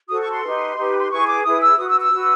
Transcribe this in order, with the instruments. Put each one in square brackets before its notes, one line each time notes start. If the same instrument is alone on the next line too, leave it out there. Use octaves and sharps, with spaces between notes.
[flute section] F#4 A4 C5 D#6
C#6
C6
D#4 G4 B4
D#4 G4 B4
C6
E4 G#4 B4 C#6
D6
E4 G#4 B4 D#6
E6
F#4 B4 D#6
E6
E6
F#4 B4